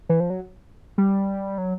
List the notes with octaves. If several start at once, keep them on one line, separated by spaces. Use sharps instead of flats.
E3
F3
F#3
G3
F#3